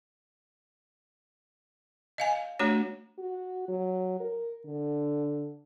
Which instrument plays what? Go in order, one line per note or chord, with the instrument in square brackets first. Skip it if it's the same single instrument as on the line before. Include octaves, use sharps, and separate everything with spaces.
[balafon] D#5 F5 G#5
A3 D4 F#4 C#5
[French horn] F#4
F#3
A#4
D3